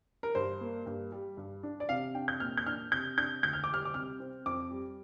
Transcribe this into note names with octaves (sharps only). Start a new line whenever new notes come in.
A#4
G2 C5
A#3
G2
G3
G2
D4
D5
C3 F5
D4 G5
G6
A#2 F6
G6
D4 F6
C3 G6
D4 G6
D2 G6
F6
D6
G3 F6
D6
C3 F6
C4
F2 D6
G3